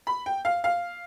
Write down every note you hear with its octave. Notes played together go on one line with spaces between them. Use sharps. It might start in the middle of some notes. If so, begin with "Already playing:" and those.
B5
G5
F5
F5